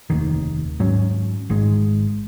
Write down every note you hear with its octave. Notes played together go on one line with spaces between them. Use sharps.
F1 D#2 D#3
G#2 F#3 C#4
G#1 G#2 D#3 G#3